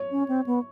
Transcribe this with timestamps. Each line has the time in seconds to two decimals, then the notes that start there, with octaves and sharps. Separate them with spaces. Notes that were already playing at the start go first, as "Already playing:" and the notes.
Already playing: C#5
0.11 C#4
0.28 C4
0.46 B3